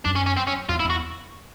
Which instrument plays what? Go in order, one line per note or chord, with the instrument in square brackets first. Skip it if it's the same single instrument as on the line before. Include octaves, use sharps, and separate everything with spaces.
[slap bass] F#2 [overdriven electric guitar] D4
[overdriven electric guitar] C#4
C#4
C4
C#4
[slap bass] E2 [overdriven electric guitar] F4
[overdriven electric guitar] E4
[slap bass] E2
[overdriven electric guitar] F#4